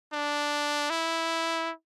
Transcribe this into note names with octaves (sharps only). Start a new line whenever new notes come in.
D4
E4